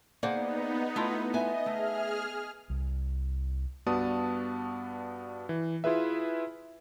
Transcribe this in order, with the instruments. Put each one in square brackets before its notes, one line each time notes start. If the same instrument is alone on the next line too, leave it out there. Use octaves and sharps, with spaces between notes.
[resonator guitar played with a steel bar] A#3 C5 [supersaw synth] B3 D#4 [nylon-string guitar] G#4 D5 F#5
[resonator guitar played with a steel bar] A3 E4 F4
[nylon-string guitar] B3 G#5 [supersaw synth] D#5 [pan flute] E5
[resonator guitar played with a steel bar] A3 [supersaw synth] G#4 F6
[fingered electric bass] C2
[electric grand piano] G2 B3 F#4 D5 A5 D#6
E3
E4 F4 G#4 B4 E5